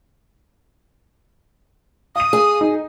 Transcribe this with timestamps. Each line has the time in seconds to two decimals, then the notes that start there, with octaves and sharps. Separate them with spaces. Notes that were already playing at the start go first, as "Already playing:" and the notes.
2.16 F5 D#6 D#7
2.33 G#4
2.61 D#4